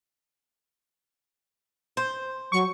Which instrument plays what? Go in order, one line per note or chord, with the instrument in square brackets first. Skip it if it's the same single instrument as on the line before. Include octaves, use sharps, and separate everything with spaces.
[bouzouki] C5
[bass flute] F#3 [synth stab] C#6